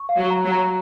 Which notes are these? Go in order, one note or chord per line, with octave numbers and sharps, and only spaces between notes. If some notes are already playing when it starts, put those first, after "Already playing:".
Already playing: C#6
F5
F#3
A#5
F#3
A#5